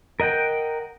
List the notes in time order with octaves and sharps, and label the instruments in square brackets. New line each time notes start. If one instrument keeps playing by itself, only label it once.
[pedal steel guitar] A#4 D#5 F#5 G5